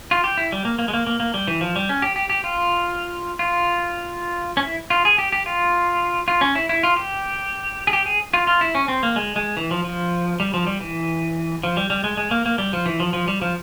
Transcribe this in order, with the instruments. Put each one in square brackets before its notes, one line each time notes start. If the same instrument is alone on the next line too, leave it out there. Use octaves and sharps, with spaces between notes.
[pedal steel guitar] F4
G4
E4
G3
A#3
A#3
G#3
A#3
A#3
A#3
G3
E3
F3
G3
C#4
G4
G4
G4
F4
F4
C#4
E4
F4
G#4
G4
G4
F4
F4
C#4
E4
E4
F4
G4
G#4
G4
G#4
F4
F4
E4
C#4
C4
A#3
G#3
G#3
E3
F3
F3
G3
F3
G3
E3
F3
G3
G3
G#3
G#3
A#3
A#3
G3
F3
E3
F3
F3
G3
F3